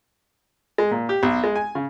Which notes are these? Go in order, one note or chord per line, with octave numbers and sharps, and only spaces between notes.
G#3
A#2
G4
B1
G#3
G#5
C#3